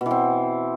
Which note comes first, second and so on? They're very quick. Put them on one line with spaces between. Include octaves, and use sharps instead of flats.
B2 E3 C4